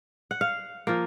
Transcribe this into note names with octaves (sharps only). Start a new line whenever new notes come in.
F#5
F5
F3 A#3